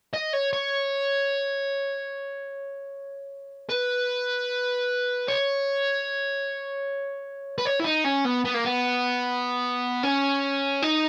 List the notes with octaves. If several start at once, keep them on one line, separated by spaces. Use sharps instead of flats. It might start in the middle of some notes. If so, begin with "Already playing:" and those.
D#5
C#5
C#5
B4
C#5
B4
C#5
E4
D#4
C#4
B3
B3
A#3
B3
C#4
D#4